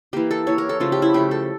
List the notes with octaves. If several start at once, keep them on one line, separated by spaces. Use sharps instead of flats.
E3 A#3 G4
A4
E3 A#3 C#5
A#4
A4
C#3 F3 A3 F4
G4
E4
C#3 F3 A3 G4
A4